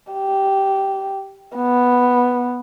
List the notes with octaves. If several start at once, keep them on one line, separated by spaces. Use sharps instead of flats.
G4
B3